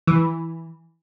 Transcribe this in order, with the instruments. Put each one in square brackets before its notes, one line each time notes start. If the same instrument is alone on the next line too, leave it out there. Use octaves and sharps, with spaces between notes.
[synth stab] E3